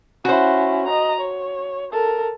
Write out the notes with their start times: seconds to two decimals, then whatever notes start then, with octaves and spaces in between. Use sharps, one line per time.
0.25 C#4 E4 F#4 C5
0.87 D#5 A#5
1.20 C#5
1.92 A4 A#4